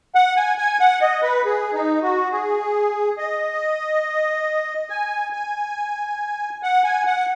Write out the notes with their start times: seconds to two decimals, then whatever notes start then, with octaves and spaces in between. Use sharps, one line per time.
0.15 F#5
0.37 G#5
0.58 G#5
0.80 F#5
1.02 D#5
1.23 B4
1.45 G#4
1.74 D#4
2.03 F#4
2.32 G#4
3.18 D#5
4.90 G#5
5.33 G#5
6.63 F#5
6.84 G#5
7.06 F#5